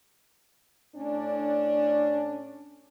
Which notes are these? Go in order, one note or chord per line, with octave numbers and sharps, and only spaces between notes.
A2 C#4 D4